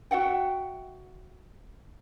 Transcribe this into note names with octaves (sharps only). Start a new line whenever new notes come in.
F#4 E5 F#5 G5